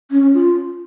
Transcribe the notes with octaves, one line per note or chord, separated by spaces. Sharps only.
C#4
F4